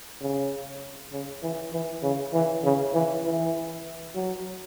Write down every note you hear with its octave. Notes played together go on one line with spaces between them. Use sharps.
C#3
C#3
E3
E3
C#3
E3
C#3
E3
E3
F#3